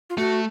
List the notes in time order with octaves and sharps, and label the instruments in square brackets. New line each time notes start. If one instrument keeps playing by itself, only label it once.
[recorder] F4
[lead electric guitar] A3 [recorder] F#4